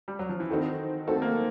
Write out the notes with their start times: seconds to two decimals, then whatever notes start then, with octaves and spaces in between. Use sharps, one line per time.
0.08 G3
0.19 F#3
0.29 F3
0.40 E3
0.50 D#3 C4 D#4 F#4 A4
1.07 A3 C4 D#4 F#4 A4
1.22 A#3